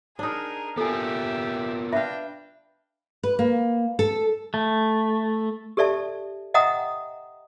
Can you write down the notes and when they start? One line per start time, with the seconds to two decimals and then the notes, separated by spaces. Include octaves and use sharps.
0.19 D4 D#4 G#4 A#4
0.77 B3 F4 G4 A4 A#4 E5 G#5
1.93 D4 B4 E5 F5 G5
3.23 B4
3.39 A#3
3.99 A4
4.54 A3
5.77 G4 A4 D5 E5 A5
6.54 D#5 E5 F#5 G5 A#5 D#6